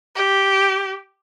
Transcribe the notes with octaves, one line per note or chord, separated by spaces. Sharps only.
G4